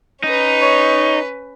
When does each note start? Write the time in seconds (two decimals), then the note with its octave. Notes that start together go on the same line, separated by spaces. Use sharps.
0.23 C#4 D#4 B4
0.62 C#5